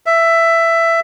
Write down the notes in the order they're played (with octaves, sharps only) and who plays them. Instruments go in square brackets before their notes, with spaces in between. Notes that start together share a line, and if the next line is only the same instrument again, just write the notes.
[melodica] E5